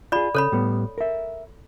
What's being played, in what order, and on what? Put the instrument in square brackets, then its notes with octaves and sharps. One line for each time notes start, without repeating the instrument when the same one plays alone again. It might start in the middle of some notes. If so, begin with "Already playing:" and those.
[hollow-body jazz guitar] F4 G#4 [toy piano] D5 B5
[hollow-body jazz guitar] C#3 [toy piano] A4 C#5 B5
[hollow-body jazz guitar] A2 G3 B3
A#4 E5